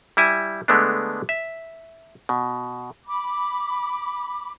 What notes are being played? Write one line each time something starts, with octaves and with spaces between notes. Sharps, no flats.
G3 E4 G#5
D3 G#3 A3 B3 D4
E5
B2
B5 D6